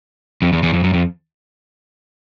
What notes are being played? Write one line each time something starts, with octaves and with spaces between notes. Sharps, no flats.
F2
E2
E2
F2
F#2
F2